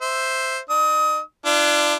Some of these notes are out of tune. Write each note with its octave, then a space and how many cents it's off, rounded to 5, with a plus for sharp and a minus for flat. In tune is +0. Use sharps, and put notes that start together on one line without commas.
C5 +0 E5 +0
D#4 -40 D#6 +30
D4 +10 F4 -40